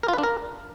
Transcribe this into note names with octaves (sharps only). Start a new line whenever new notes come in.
A#4
F4
B4
D4
A#4